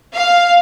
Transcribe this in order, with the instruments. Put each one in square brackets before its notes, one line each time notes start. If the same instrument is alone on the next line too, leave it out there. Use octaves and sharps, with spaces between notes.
[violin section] F5